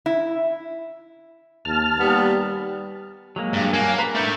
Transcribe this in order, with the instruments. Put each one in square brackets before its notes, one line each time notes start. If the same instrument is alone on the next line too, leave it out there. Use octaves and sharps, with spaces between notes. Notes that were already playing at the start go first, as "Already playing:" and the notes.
[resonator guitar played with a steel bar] E4
[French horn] D#2 [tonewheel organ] A5 F6
[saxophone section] D#2 B3 [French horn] G3
[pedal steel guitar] F#3 G#3 A#3
[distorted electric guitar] G2
[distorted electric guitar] A#3 [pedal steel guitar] C#5 F#5 G#5
[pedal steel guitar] B4 A#5 B5
[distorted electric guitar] A3 E4 [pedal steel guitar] D4 A5 G6